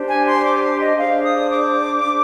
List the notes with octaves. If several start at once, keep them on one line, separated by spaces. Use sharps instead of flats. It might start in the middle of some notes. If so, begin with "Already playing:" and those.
Already playing: D4 G4 C5
G#5
C6
D6
C6
D#5
D4 G#4 C5 F5
D#6
D6
D4 G#4 C5